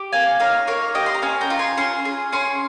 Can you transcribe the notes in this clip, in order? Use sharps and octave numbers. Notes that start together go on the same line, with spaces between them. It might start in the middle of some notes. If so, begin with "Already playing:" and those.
Already playing: G4
A#3 F5 G#5
D#4 C#5 F5
A#3 C#5 F5
G4 D#5 G5
C6
A#5
C#4 F5 G#5
G5 A#5
F4
G#5 C6
C#4 G#5 C6
G#4
C#4 G#5 C6